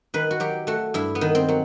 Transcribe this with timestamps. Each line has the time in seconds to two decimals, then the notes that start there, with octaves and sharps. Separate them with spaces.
0.14 D#3 B4
0.31 F#4
0.40 F#3 G4
0.67 A3 F#4
0.94 G2 E4
1.15 B3
1.21 D#3
1.35 C4
1.48 F#3